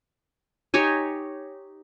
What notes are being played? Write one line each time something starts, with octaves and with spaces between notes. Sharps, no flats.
D#4 G4 C#5 G#5